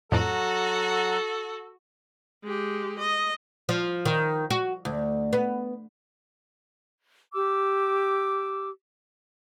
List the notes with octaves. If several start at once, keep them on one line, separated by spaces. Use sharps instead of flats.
F2 A2 F#3 F#4 A4 F#5 A5 A#5
G#3 G4
D#5
F3
D#3
F#4
D2
B3
G4 D6 E6